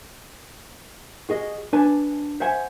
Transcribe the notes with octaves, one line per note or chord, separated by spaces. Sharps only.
F#4 G#4 D#5
D4 B4 G#5 A5
C5 E5 F#5 G#5